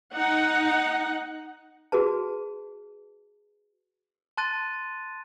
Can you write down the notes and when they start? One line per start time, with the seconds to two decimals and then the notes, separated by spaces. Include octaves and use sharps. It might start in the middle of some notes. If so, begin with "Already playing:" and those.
0.14 D#4 F#5
1.92 F#4 G#4 B4 A5
4.37 A5 C6 F#6 A6 D#7